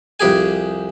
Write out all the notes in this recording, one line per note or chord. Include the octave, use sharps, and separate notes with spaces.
C2 F2 G4 G#4 G#5